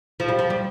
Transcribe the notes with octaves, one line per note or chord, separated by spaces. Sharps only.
F3
G3
F3
G3